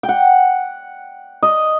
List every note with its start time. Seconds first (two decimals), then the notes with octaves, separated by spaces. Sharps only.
0.03 G5
0.09 F#5
1.43 D#5